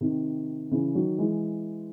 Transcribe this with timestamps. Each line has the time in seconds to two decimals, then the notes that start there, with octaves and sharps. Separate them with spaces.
0.01 C3 D#3
0.71 C#3 E3
0.95 D#3 F#3
1.18 E3 G#3